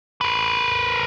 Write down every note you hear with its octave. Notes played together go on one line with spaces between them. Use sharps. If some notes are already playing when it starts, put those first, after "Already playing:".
A#4 B4